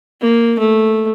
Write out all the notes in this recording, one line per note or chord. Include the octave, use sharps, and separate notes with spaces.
A#3
A3